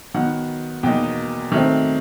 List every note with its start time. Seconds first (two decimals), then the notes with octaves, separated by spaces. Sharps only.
0.15 D#3 F#3 B3 F#5
0.83 E2 B2 F#3 A#3 D#4 G5
1.52 D#3 F#3 A3 C4